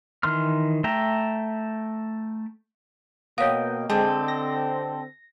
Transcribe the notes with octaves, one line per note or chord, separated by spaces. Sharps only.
D#3 E3 C6 F6
A3 E5 G5 A#5
B2 A#3 B3 C#5 D#5 F5 G5
D3 G#3 C4 G4 A4 D#5
A#6